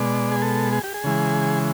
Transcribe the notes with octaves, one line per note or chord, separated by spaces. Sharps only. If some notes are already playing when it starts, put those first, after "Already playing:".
Already playing: B2 G#3 D5
G#4
A4
G#4
G4
G#4
C#3 E3 G#3